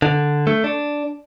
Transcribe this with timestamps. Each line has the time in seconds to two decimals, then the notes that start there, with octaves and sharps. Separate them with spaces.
0.02 D3
0.47 A3
0.64 D4